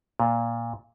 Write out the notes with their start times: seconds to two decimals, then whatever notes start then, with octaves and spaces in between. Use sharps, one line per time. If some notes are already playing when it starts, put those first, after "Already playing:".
0.20 A#2